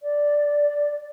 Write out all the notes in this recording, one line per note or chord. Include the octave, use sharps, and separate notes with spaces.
D5